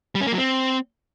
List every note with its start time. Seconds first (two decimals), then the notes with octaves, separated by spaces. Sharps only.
0.15 G3
0.21 C#4
0.27 A#3
0.32 F#3
0.38 C4